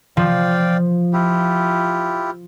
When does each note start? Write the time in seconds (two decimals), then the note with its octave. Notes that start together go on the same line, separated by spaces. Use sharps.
0.17 F3 D5 F5 G5
1.13 E4 F4 G4